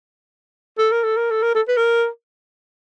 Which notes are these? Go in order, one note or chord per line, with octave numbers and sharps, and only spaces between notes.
A4
A#4
A4
A#4
A4
A#4
A4
B4
A#4